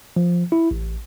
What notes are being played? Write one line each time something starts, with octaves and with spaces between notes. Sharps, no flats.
F3
E4
A1